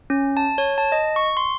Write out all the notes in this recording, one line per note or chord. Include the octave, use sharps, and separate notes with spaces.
C#4
A5
C#5
A5
D#5
C#6
C6